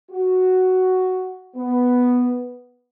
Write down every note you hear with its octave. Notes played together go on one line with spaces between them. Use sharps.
F#4
B3